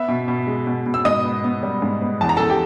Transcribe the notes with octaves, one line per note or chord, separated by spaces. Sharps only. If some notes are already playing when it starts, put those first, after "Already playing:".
Already playing: B3 E5 E6
B2
B2
G#3
B2
B2
E6
G#2 D#5 D#6
B3
B3
G3
G#2
B3
E2 A5
A#5
E2 A4 A5
G4 G5